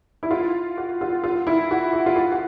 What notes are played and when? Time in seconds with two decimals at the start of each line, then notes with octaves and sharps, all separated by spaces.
0.23 E4
0.31 F4
0.77 F#4
1.01 F4
1.24 F4
1.47 E4
1.71 F#4
1.93 F#4
2.06 F4
2.16 F#4
2.32 F#4